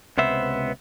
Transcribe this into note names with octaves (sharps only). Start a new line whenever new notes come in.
C#2 C3 B3 C5 E5